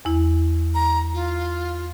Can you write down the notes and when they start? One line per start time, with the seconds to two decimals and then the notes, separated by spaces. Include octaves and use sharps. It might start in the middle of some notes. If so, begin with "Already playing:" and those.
0.05 E2 E4
0.75 A#5
1.14 F4